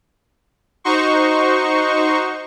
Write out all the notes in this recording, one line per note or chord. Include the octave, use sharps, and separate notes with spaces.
D#4 F#4 C5 C#6